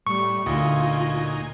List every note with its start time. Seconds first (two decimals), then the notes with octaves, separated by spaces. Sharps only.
0.07 A2 G3 C#6
0.46 D2 A#2 D#4 F4 G#5